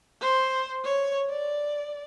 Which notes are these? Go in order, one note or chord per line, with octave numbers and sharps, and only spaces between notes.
C5
C#5
D5